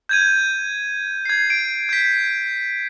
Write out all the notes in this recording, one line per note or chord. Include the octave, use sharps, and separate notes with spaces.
G6 G#6 D#7
G#6 C7
D7
G6 B6